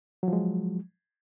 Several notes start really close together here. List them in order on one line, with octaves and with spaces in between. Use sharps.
F#3 F3 G#3